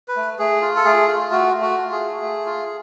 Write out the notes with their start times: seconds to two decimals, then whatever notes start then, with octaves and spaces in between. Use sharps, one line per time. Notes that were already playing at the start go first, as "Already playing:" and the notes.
0.08 B4
0.17 A3
0.38 A3 G#4
0.62 F4
0.76 A4
0.84 A3 G#4
1.07 F4
1.31 A3 F#4
1.54 A3
1.62 F#4
1.77 F4
1.91 G#4
1.99 A3
2.22 A3
2.46 F4